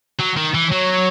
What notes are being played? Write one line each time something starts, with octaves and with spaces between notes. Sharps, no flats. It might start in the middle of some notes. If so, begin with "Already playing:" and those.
F#3
D#3
E3
F#3 C#5